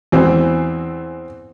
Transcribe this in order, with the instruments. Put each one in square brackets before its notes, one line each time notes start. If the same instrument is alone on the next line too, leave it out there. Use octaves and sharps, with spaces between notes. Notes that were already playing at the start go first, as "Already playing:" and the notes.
[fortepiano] E2 E3 C4